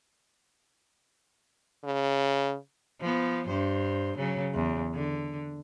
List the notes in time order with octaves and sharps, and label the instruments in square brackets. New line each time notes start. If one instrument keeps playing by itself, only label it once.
[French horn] C#3
[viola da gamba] F3 B3
G2 C5
C#3 F#3
E2
D3